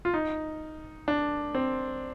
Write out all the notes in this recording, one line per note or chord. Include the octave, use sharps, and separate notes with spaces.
F4
D#4
D4
C4